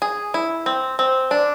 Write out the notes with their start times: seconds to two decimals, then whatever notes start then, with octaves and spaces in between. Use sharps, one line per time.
0.02 G#4
0.34 E4
0.66 C4
0.99 C4
1.31 D4